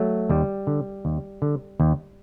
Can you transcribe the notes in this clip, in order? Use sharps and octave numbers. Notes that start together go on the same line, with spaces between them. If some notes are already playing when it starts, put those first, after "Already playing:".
Already playing: F#3 A3
D#2 G3
D3
D#2
D3
D#2